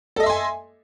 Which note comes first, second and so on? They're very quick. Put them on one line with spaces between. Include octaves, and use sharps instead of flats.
A4 D#5 E5 C6 G#5